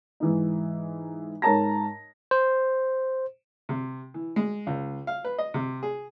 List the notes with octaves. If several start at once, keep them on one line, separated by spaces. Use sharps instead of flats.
G#2 E3 D#4
G#2 A#4 C#5 A5 A#5 A#6
C5
C3
E3
G#3
C#2
F5
B4
D#5
C3
G#4